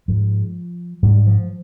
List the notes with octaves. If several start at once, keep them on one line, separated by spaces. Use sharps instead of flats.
G#2 F3
G#2 G3
F3